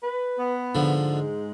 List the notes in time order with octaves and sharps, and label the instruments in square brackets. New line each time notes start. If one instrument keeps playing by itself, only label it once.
[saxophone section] B4
B3
[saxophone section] G#2 [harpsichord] D3 F3
[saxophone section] G#3